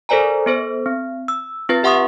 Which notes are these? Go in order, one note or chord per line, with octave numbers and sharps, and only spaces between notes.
A4 A#4 C5 D5 G#5 A#5
B3 A4 C5
C4
E6
C4 F4 B4 A6
G4 E5 F#5 C6 C#6 D#6